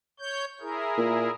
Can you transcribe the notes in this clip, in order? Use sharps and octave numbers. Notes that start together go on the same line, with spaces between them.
C#5 G6
E4 G#4 A#4
A#2